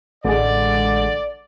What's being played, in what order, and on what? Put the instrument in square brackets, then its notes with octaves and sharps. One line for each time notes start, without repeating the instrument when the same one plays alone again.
[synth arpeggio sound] A1 G#3 [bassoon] D3 [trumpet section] D5